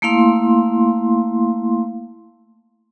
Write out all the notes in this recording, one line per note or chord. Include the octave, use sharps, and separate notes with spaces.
A3 A#3 E4 F5 C6